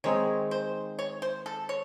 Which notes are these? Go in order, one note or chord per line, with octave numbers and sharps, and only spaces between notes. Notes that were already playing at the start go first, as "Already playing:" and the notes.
D#3 G#3 C4 D#4 G#4 C#5
C5
C#5
C5
A4
C#5